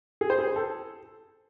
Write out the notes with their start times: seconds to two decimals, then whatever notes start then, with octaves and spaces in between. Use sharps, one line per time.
0.21 G#4
0.30 C5
0.39 G#4
0.47 C5
0.56 A4